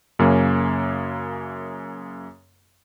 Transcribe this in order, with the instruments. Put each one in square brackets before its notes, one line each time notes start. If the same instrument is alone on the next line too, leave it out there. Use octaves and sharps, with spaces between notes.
[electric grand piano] F#2 C#3 A#3 C#4